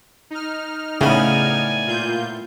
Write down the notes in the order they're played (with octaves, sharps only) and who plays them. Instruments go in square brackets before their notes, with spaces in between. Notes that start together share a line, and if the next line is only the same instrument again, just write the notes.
[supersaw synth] D#4 F6
[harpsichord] A2 B3 [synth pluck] C#3 [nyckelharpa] D5 G#5
[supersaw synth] A#2 F4 G6